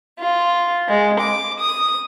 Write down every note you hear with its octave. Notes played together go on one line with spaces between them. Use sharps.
F4
G#3
D6
D#6